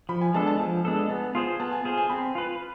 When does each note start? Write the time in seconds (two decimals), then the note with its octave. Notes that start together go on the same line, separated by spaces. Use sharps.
0.09 F3 B5
0.21 G#5
0.34 G#3 B3 D4 A4 A5
0.47 A5
0.59 F3
0.85 G#3 B3 D4 A4
1.10 B3 A5
1.35 F4 G#4 C5 C6
1.60 B3 A5
1.72 G#5
1.84 F4 G#4 C5 G#5
1.98 G#5
2.10 C4 B5
2.35 F4 B4